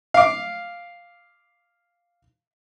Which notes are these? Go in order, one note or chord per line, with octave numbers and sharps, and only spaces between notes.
F5 D6